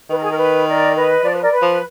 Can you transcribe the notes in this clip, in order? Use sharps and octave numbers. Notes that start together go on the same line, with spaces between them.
D#3 B4
A#4
G#4
A#4
B4
A#4 D5
B4 D#5
F3 D5
B4
A#4 D5
B4
F3